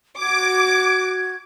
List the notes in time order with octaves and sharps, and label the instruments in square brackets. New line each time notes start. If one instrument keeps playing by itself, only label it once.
[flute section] F#4 G#6 [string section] D6